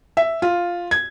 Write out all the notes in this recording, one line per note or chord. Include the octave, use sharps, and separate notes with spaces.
E5
F4
G#6